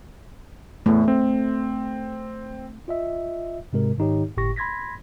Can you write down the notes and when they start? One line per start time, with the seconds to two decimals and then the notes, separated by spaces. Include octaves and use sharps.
0.86 E2 A2 A3
1.08 C4
2.88 F4 D#5 E5
3.73 G#2 C3 G#3 A#4
3.98 G#2 D#3 D#4 G4 C#5
4.37 G1 A2 G4 C#6 A#6
4.56 B5 C6 G#6 A#6 B6